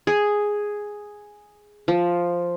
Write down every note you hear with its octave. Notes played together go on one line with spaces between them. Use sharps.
G#4
F3